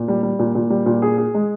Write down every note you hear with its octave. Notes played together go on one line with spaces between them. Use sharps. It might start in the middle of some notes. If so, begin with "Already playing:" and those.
Already playing: A#2
G3
G3
A#2
A#2
G3
A#2
G#4
G#4
G#3